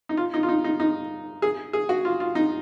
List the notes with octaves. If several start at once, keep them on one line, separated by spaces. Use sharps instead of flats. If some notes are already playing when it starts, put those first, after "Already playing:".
D#4
F4
D#4
F4
D#4
D#4
D#4
G#4
G#4
F#4
F4
F4
D#4